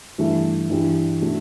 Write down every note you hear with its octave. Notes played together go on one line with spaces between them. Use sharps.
G2 E3 A3 E4
G2 E3 G3 D4 G4
B2 A3 D4